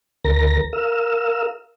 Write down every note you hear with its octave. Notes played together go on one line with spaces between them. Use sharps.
D2 A#4 A#6
A#4 F5 E6